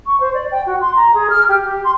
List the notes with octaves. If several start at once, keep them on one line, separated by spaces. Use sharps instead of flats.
C#6
C5
D5
G5
F#4
C6
A#5
G#4
F6
G4
G4
C6